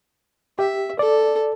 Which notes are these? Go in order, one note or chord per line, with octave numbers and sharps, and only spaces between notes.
G4 E5
A4 D5